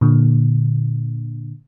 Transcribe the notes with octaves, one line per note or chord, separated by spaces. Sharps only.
A#2 D3